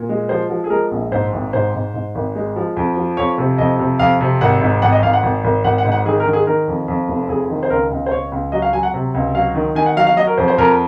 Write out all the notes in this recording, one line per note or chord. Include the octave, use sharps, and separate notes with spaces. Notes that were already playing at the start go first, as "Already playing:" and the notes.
Already playing: A#2
G#3
F3 C5
F3
G#4
G#3 A#4
A#1
G#2 C5
G#1
G#2 C5
G#2
G#2
G#1
G#3
F3
F2
F3
F2 C#5
C3
F2 D#5
C3
F2 F5
C3
G#1 F#5
G#2
G#1 F#5
D#5
G#1 F5
F#5
G#1
G#1
G#1 F#5
F#5
G#2
F#5
D#3 G#4
A#4
D#3
G#4
D#3 A#4
F2
F2
F1
F2 G#4
D#3
C5
C#2 A#4
C#2
C5
C#2 C#5
C#2
F#3 D#5
F5
F#3 G#5
F#5
C3
C#2
F#3 F5
D#3
D#3 G#5
F#5
F#3 F5
F5
F#3 D#5
A#4
F2 C5
C5
F2 A#4